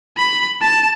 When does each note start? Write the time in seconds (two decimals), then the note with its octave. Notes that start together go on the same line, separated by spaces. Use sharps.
0.17 B5
0.61 A5